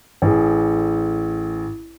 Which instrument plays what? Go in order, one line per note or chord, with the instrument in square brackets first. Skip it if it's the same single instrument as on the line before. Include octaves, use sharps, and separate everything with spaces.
[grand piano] A1 G#4